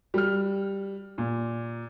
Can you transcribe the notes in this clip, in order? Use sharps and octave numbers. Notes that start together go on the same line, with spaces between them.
G3 F6
A#2